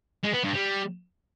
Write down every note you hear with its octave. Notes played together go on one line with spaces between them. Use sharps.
G#3
B3
G2
G3